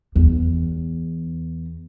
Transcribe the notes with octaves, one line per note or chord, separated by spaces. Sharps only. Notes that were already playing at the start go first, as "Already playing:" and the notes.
E2